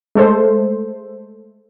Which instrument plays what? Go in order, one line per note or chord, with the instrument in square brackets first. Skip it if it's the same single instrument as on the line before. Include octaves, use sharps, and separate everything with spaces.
[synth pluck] G#3 A3 A4 C5